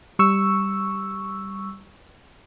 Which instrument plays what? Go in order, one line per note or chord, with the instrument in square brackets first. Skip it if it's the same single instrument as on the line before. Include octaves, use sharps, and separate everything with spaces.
[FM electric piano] G3 C#6 E6